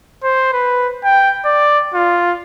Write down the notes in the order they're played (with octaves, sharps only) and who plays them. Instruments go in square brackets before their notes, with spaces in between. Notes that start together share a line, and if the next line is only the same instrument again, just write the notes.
[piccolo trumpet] C5
B4
G5
D5
F4